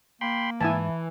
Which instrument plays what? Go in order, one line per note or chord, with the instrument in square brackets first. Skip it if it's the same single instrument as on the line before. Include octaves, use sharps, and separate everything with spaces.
[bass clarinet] A#3 [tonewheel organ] G5 B5 C6
[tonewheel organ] G#2 [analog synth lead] E3 [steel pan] E4 G#5 A5